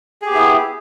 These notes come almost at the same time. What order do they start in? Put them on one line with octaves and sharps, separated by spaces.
G#4 G4 B3 E4